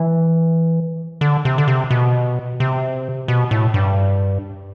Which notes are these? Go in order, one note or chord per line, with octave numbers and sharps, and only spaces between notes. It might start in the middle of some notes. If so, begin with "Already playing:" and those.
Already playing: E3
D3
C3
D3
C3
B2
C3
B2
A2
G2